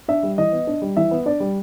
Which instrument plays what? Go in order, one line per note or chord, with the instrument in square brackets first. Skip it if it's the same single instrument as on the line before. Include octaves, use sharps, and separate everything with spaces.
[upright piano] D4 E5
G3
E3 D#5
B3
D4
G3
E3 E5
B3
D4 D5
G3